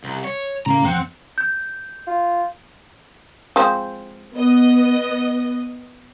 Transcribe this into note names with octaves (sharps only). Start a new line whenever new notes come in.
C2
C#5
A2 C#3 F5 A#5
F2 C4 F#5
G6
F4
F3 G#3 C4
B3 D#5